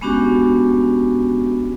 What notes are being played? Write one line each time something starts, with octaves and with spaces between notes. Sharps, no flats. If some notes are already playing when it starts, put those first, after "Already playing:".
G#3 B3 C#4 D4 F#4 G4